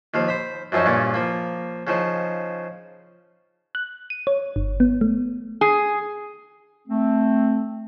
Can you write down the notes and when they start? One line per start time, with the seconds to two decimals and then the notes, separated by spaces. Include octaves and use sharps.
0.14 D#2 F3 F5
0.28 C5 B5
0.72 F#2 F3 C4 C#4 D#4
0.86 G2 A#2 C#4 D5
1.14 F3 A#3
1.87 C#3 F3 D#4
3.75 F#6
4.10 D#7
4.27 C#5
4.56 G1
4.80 B3
5.01 A3
5.61 G#4
6.88 A3 C4